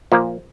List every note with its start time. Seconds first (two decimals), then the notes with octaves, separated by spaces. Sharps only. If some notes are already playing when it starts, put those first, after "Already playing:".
0.12 A#2 F3 A#3